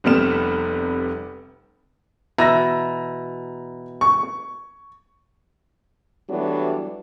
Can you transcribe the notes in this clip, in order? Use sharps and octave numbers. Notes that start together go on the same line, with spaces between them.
F1 C3 G3 B3 F6 E7
B2 E3 E4 A#5 E6 A#6
C#6
E3 F#3 G3 A3 B3 D4